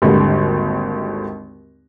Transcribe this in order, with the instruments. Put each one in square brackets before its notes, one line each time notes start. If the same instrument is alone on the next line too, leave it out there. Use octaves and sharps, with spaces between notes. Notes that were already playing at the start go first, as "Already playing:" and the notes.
[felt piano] G#1 D#2 D3 G3